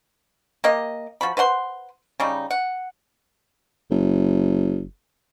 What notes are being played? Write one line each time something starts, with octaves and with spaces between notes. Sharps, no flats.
A#3 G4 D#5
F3 F#4 B5
B4 C5 F#5 C6
C#3 G3 D#4
F#5
F#1